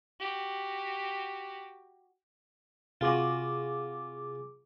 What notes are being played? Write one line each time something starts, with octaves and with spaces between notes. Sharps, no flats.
F#4 G4
C3 F4 F#4 G#4 D6